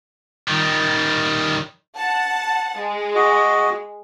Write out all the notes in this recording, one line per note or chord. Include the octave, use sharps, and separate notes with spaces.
D#3 G3
F#5 A5
G#3
F#4 D#5